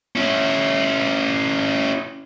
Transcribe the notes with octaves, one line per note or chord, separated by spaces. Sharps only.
C#4 E4